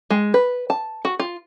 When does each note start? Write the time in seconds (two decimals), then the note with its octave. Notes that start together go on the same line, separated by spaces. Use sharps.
0.11 G#3
0.34 B4
0.70 A5
1.05 F#4
1.20 F4